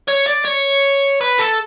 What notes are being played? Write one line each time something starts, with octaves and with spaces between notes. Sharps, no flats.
C#5
D5
C#5
B4
A4